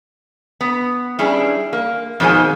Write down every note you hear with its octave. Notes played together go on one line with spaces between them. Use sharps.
B3
G3 C#4 D4 E4 G#4
A#3
F2 B2 D#3 G#3 C5 G#5